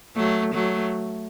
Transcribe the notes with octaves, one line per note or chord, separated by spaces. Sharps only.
F#3 A3
F#3 A3